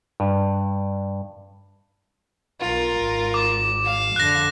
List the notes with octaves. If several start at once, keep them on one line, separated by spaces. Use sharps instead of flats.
G2
B1 F4 A#4
G#1
D6
F5
F2 D3 F#6 A#6